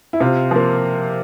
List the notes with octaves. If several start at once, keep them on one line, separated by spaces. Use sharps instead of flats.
E4
C3 F4
F3 A#3